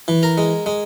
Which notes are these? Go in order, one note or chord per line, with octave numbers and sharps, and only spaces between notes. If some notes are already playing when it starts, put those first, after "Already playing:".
E3
A#4 A#5
G#3
G#3